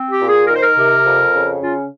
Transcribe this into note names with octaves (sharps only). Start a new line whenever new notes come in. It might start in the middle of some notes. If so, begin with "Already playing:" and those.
Already playing: C4
G4
A#2
G#4
D#3 A#4
C5
A#4
C3
F2
C#3
C#4 F4